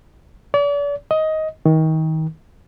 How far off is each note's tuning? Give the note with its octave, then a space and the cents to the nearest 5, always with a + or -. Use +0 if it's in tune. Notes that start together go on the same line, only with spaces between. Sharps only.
D5 -40
D#5 +15
D#3 +30